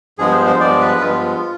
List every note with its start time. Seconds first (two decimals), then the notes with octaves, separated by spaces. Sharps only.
0.19 G2 F3 G#3 B3 G#4
0.32 C5
0.47 C5
0.59 G2 F3 G#3 B3 D5
0.81 B4
1.01 G2 F3 G#3 B3 F4